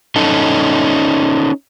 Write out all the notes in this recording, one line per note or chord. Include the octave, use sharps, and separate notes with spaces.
C#4 D#4 A4